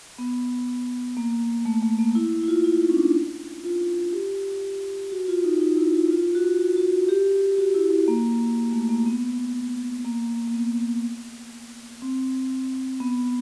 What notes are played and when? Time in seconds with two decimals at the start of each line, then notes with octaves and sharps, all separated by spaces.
0.18 B3
1.17 A#3
1.65 A3
1.83 A3
1.99 A#3
2.15 E4
2.44 E4
2.48 F4
2.64 E4
2.81 D#4
2.90 C#4
2.97 D4
3.64 F4
4.13 G4
5.12 F#4
5.28 F4
5.44 D#4
5.60 D#4
5.77 E4
5.94 F4
6.10 F4
6.35 F#4
6.59 F#4
6.76 F#4
6.92 F#4
7.09 G4
7.58 F#4
7.74 E4
7.90 E4
8.08 A#3
8.73 A3
8.89 A#3
9.06 B3
10.05 A#3
10.47 A#3
10.54 B3
12.02 C4
13.00 B3